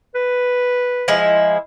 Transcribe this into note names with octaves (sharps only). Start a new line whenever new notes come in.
B4
F3 G#3 E4